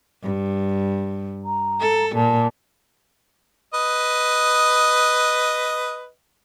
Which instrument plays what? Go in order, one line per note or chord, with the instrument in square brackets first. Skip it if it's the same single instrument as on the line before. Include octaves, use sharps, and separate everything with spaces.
[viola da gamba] G2
[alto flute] A#5
[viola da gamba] A4
[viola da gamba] A#2 [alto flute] A5
[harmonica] B4 D#5